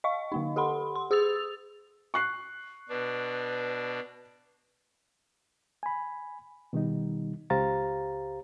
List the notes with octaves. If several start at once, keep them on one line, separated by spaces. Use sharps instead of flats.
D#5 F5 C#6
D3 A#3 D#4
G4 A4 F#5 B5 C6
C6
G#4 D#6 E6 A6 F7
C#6 F#6 C7
B2 D4 B4
G#5 B5
B2 D#3 G3 D#4
C#2 G4 C5 F5 A#5 A6